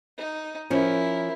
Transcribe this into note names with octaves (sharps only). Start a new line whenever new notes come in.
D#4
F3 C#4 E4 A#4